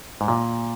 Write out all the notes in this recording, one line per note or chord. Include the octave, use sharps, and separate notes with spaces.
G#2
A#2